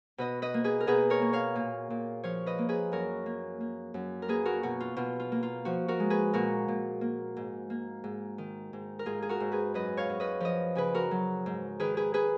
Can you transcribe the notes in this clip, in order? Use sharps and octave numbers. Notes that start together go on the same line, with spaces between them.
B2 B4 D#5
B4 D#5
A#3
G#4 B4
A#4
B2 G#4 B4
A#4 C#5
A#3
C#5 F5
A#2
A#2
F3 C#5 F5
B4 D#5
A#3
G#4 B4
F#2 A#4 C#5
A#3
A#3
F#2
A#4
A#3 G#4 B4
F#4 A#4
B2 F#4
F4
B2 F4
F4
A#3
F4
F3 F#4
F#4 A#4
G#3
G#4 B4
A#2 F#4 A#4
A#2
A#3
G#2
A#3
G#2
D#3
G#2
A#4
G#2 F4 G#4
G#4
F#4 A#4
G#2
G#4 B4
F#2 B4 D#5
C#5 F5
F#2
B4 D#5
F3 B4 D#5
C#3 G#4 B4
F#4 A#4
F#3
G#2
D#3 G#4 B4
G#4 B4
G#4 B4